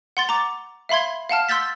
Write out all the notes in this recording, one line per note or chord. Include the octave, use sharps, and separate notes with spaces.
F#5 C6 A6
A#5 D6
E5 F5 B5 C6 G#6
F5 F#5 A5 F6
C6 E6 G6 A6 B6